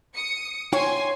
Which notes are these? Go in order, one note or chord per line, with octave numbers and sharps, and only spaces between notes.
D#6 C#7
D#4 F4 C5 C#5 G5 G#5 C6